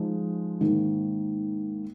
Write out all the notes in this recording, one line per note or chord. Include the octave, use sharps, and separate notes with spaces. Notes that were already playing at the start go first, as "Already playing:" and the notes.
Already playing: F3 G#3 D#4 G#4
G#2 D#3 A#3